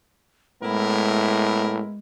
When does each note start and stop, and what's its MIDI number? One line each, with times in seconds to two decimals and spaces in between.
0.62 1.82 45
0.62 1.98 56
0.62 1.98 59
0.62 1.98 64
0.62 1.98 70